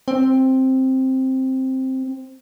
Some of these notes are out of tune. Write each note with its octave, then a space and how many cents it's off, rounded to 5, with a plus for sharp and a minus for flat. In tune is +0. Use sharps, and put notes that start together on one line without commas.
C4 +5